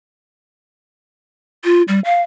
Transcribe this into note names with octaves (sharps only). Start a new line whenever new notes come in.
F4
G3
F5